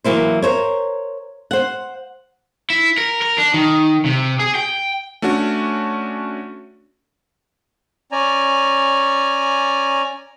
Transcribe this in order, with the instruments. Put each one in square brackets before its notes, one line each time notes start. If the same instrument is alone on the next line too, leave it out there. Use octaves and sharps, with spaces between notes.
[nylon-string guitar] E3 F#3 A#3 E4 C5
A#4 C5 C#5
C5 F#5
[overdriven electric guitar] E4
A#4
A#4
D4
D#3
C3
G#4
G5
[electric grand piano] A3 C#4 D4 F#4
[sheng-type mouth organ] C#4 D5 G#5 A#5